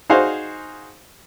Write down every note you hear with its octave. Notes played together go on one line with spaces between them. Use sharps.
D#4 F#4 G#4 C5 F5